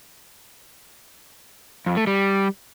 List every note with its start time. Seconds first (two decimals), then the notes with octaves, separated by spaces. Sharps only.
1.86 F2
1.97 A3
2.07 G3